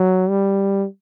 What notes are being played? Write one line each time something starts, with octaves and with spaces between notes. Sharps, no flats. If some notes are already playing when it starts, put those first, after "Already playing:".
Already playing: F#3
G3